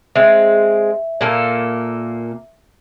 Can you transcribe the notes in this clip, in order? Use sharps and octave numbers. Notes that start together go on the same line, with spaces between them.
G#3 C4 E5
A#2 A#3 A4